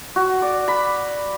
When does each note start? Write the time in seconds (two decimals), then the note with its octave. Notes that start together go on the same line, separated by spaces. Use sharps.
0.16 F#4
0.42 D5
0.68 B5